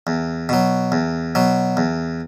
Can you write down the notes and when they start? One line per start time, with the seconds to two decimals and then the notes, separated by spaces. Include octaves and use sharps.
0.07 E2
0.49 B2 F#3
0.92 E2
1.35 B2 F#3
1.77 E2